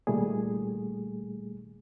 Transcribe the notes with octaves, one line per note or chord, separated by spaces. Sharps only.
C2 A#2 D#3 G3 A3 G#4